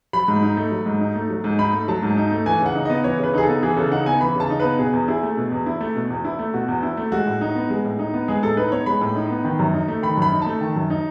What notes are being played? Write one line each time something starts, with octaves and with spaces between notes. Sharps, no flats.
F#3 B5
G#2
D#4
A3
F#3
G#2
D#4
A3
F#3
G#2
D#4 B5
A3
F#3 A5
G#2
D#4
A3
E3 G#5
C#3
F#5
D#4
B3 D#5
E3 C#5
C#3 B4
D#4 G#4
A4
B3
E3 G#4
C#3 A4
D#4 F#5
B3 G#5
E3 B5
C#3 A5
D#4
B3 B4
B2 G#4
E2
E4 G#4
A3
B2
E2
E4
A3
B2
E2
E4
A3
B2 F#4
E2
E4
A3
G#3 F#4
A2
D#4
B3
G#3
A2
D#4
B3
G#3 G#4
A2 A4
D#4 B4
B3 C#5
G#3 B5
A2
D#4
B3
D#3
F#2
D#4
A3
D#3 B5
F#2 B5
D#4
A3 A5
D#3
F#2
D#4